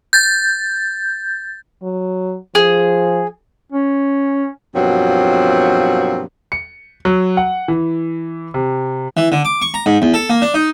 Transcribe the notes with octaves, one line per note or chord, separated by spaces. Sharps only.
G6 A6
F#3
F3 G#4
C#4
G2 B2 F3 F#3 A#3 C4
C#7
F#3
F#5
E3
C3
E3
D3
D6
C#6
A#5
G#2
E2
A4
A#3
D4
D#4